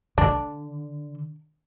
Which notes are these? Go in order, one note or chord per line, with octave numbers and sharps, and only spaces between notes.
D3 D4